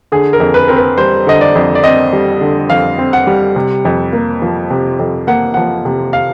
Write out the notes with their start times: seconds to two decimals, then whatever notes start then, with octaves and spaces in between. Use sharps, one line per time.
0.12 D3 G#4
0.33 A#4
0.40 F2
0.54 B4
0.68 C4 A#4
0.76 B4
0.98 G3 C5
1.27 D3 D#5
1.41 D5
1.55 F2
1.75 D5
1.84 C4 D#5
2.13 G3
2.41 D3
2.70 F2 F5
2.98 C4
3.13 F#5
3.27 G3
3.56 C3
3.85 F2
4.13 A#3
4.42 F3
4.70 C3
4.99 F2
5.27 A#3 F#5
5.54 F3 F#5
5.85 C3
6.13 F5